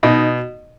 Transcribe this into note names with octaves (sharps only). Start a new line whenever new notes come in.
B2 D#4